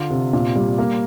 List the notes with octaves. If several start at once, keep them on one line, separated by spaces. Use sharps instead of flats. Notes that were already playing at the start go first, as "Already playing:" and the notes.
Already playing: D3 F4
C3
A#2
G3
A#3